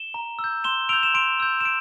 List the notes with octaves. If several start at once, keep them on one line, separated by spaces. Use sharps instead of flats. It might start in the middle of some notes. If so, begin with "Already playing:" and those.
Already playing: E7 G7
A#5
E6
G6
C6 E7 G7
E6 G6 D7 F7
E7
C6 D7 F7
E6 G6
E7
D7